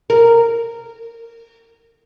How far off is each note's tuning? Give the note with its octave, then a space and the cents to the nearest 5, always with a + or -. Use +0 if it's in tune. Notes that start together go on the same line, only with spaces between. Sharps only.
A#4 -15